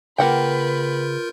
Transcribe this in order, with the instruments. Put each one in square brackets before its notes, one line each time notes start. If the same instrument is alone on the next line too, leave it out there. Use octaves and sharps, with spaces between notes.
[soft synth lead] C#3 [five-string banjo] A#3 F#5 G5 [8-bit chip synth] F4 A#4 G6 [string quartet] B4